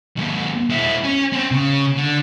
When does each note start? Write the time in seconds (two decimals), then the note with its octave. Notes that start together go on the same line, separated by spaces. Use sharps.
0.16 D#2 G#2
0.70 G#3 E4
1.04 C#4
1.33 C4 C#4
1.51 C#3
1.97 D3